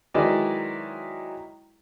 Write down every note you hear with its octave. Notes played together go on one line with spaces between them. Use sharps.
D#3 F#3 G#3 E4 B4 D5